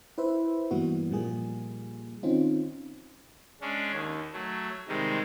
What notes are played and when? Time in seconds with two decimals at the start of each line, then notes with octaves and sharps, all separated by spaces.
0.18 E4 B4 C5 E5
0.71 G2 E3 G3 A#3 B3 F#4
1.11 A#2 F3 G3 A#3 G#4
2.23 D#3 C4 C#4 D#4 F4
3.61 G#3 C#4 D4
3.92 D#2
4.33 F#3 A3
4.88 C3 D#3 G3 G#3